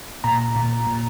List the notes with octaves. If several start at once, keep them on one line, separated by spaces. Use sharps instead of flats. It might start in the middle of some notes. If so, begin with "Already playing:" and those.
A#2 A#5
A#2
A#2